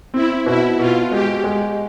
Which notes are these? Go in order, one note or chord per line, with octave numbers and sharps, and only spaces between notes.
C4 E4
B2 E4
B2 F4
G#3 G4
G#3